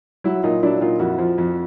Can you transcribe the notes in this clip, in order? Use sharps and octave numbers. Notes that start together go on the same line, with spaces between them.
F#3 E4 F#4
A#2 D#4 F4
F#3 D4 E4
A#2 D#4 F4
F2 E4 F#4
F3
F2